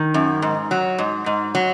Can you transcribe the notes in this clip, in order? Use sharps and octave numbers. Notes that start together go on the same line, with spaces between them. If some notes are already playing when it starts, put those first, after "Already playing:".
Already playing: D#3
F#2
G#2
F#3
G#2
G#2
F#3